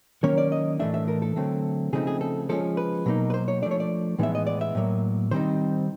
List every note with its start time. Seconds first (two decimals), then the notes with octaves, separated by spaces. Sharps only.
0.24 D#3 F#3 A#3 C#4 C#5
0.38 D5
0.52 D#5
0.79 A2 E3 A3 D4 E5
0.94 E5
1.08 A#4
1.22 A4
1.36 D3 F#3 A3 C4
1.93 C#3 F3 A3 C4 D#4 G#4
2.07 G#4
2.21 A4
2.49 F3 G#3 C#4 A4
2.77 B4
3.06 B2 F#3 A#3 D#4
3.30 B4
3.34 C5
3.48 C#5
3.62 F3 A3 D4 D5
3.71 C#5
3.80 D5
4.18 A2 E3 G#3 B3 D#4 E5
4.35 D#5
4.47 D5
4.61 E5
4.75 A2 F#3 A#3
5.31 D#3 G3 C4 D#4 C5